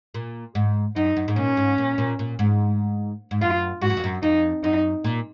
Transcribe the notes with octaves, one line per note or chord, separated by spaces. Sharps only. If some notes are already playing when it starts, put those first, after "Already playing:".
A#2
G#2
F#2 D#4
F#2
G#2
A#2 C#4
G#2
A#2
A#2
A#2
G#2
G#2
F#2 F4
G#2 F#4
F#2
F2
F#2
F2 D#4
F#2 D#4
A#2